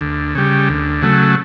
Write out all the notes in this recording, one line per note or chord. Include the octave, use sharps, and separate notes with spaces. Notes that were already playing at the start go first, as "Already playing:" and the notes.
D2
C#3 G3
D2
C#3 F#3 A3